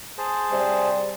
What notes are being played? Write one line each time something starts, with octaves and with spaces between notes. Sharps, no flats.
G#4 C5 A5
C3 G3